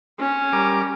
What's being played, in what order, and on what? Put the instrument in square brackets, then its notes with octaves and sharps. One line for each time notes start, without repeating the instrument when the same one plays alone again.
[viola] C#4
[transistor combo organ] G3 A#4 D6